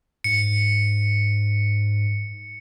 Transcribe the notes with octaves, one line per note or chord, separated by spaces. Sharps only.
G#2 C#7